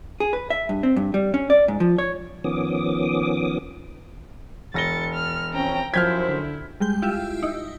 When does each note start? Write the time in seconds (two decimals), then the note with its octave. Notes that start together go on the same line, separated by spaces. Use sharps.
0.20 G#4
0.33 B4
0.50 E5
0.69 G2
0.83 C4
0.96 G2
1.14 G3
1.34 C#4
1.50 D5
1.68 G#2
1.80 F3
1.98 C#5
2.44 D#3 F3 B3 C#4 D6 D#6
4.74 E1 A6 A#6 C#7 G7
5.14 F6
5.54 F3 C4 C#4 G5 A#5
5.94 F#2 F3 E4 C5 F6 G6 G#6 B6
6.28 D3
6.80 G3 G#3 G6
7.02 E4 F4 G4 E5
7.43 D#4 E4